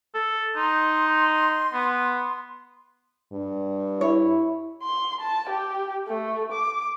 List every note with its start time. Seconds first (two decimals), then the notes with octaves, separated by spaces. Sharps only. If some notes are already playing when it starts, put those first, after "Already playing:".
0.14 A4
0.56 D#4 C6
1.73 B3
3.33 G2
4.01 E4 C#5
4.83 C6
5.21 A5
5.50 G4
6.07 A3
6.52 D6